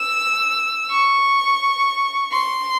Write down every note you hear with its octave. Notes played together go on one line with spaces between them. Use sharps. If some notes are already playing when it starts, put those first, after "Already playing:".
Already playing: E6
C#6
C6